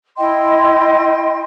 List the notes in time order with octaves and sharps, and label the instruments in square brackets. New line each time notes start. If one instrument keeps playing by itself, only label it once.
[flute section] E4 D#5 G5 C6